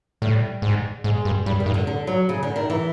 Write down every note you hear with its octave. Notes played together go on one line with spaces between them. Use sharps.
A2 G3
G#2
G#2 G#3
G2
G2 G3
D#3
G2
D3
D3
F#3
C#3
D3
D#3
E3